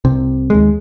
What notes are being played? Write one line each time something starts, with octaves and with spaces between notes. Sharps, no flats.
C2 C3
D#2 G#3